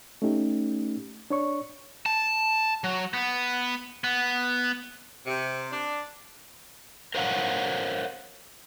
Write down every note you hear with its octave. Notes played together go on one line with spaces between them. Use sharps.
A3 C#4 D#4 G4
D4 C#5 C#6
A5
F#3
B3
B3
C3
D4
A#4 C5 C#5 F5 F#5